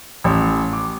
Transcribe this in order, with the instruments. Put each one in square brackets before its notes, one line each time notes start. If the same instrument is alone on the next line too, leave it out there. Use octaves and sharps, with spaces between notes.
[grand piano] A1
D6